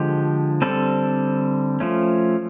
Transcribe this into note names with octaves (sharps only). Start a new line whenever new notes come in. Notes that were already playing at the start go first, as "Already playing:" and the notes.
Already playing: D3 F3 G#3 G4
D3 G3 C4 A4
F3 A3 C#4